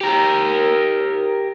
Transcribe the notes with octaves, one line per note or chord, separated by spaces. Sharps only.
G4 A#4